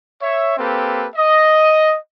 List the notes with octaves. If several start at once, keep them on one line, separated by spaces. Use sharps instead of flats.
C#5 E5
A#3 C4 G4 A4 B4
D#5